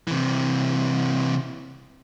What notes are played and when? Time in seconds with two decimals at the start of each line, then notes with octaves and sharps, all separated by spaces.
0.08 C3 E3